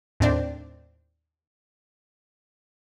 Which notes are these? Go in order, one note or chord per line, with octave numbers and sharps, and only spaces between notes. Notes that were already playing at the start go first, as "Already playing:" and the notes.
D#2 A2 C4 D4 D5